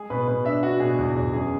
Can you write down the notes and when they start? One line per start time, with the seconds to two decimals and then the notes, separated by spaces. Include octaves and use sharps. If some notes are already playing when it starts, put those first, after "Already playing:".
Already playing: G#3 G#4
0.10 B2 B4
0.27 B2 B4
0.45 D4 E5
0.63 D4 F#4
0.80 B2 G#4
0.98 E2
1.16 E2
1.33 F#2 G#4